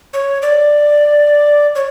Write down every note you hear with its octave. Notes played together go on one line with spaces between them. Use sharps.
C#5
D5
C#5